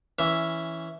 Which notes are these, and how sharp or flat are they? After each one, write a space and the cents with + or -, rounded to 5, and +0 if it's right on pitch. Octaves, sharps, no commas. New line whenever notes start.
E3 +0 C#4 +0 E5 +0